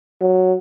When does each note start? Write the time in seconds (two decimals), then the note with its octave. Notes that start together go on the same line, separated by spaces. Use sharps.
0.21 F#3